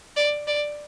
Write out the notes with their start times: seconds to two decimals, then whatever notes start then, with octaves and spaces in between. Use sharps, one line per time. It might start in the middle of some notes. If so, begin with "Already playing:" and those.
0.17 D5
0.47 D5